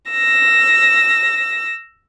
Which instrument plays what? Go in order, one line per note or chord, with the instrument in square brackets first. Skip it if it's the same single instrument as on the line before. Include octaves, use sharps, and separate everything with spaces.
[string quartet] E6 A#6